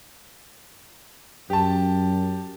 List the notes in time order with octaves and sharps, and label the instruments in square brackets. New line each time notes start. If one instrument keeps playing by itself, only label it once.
[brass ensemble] F#2 [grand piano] G4 A5